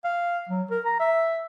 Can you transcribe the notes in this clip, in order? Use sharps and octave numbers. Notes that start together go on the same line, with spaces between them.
F5
F#3
A#4
A#5
E5